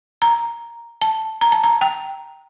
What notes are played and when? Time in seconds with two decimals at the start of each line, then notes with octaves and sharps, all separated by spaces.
0.22 A#5
1.02 A5
1.41 A#5
1.52 A5
1.64 A#5
1.81 G5